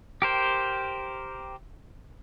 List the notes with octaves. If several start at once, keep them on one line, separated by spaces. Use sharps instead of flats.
G4 A#4 C5 G5